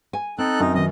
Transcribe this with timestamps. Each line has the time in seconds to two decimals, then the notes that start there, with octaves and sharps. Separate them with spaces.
0.13 G#5
0.38 C4 D#4 A4 F#6
0.60 F#2 D#4
0.75 D#3 F#3 D#5